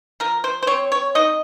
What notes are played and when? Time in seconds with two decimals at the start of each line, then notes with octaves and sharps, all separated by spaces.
0.20 F3 A#4
0.44 C5
0.63 C5
0.67 C4 C#5
0.92 C#5
1.15 D#4 D#5